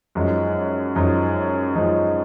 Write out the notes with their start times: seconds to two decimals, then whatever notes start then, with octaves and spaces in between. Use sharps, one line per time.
0.15 F#2 F3 G#3 D#4
0.95 F#2 F3 G#3 D#4
1.75 F#2 F3 G#3 D#4